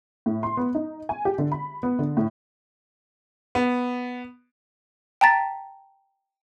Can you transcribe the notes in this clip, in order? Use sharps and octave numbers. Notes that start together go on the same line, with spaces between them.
A2
C6
B3
D#4
G#5
G4
D3
B5
B3
D3
A2
B3
G5 A5 A#5 A6 B6